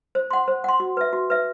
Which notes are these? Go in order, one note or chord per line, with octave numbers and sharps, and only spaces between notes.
C5
F#5 C6
C5
F#5 C6
F#4
B4 E5
F#4
B4 E5